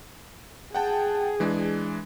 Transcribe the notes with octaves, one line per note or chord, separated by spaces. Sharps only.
G#4 F#5 G5 A5
E3 G#3 D4